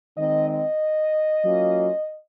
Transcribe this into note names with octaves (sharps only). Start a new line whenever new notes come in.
D#3 G#3 C4 D#4 D#5
D#5
F#3 A#3 C#4 F4